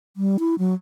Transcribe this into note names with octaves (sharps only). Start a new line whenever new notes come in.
G3
E4
F#3